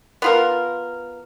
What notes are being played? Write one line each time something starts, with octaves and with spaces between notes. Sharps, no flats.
B3 F4 A#4